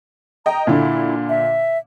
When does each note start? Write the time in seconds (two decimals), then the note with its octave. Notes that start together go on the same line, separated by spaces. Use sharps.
0.46 D#5 G5 A#5
0.67 A#2 D3 E4
1.29 E5